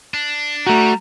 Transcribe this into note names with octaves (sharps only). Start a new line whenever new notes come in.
D4
G3 A3 F#4 A#5